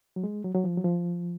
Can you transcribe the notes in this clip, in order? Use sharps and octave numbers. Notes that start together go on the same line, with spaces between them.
F#3
G#3
F#3
F#3
F3
F#3
F3